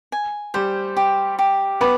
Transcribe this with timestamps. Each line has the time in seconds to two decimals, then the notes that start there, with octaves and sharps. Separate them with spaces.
0.12 G#5
0.54 G3 G4 C5
0.97 G4
1.39 G4
1.81 B3 B4 D5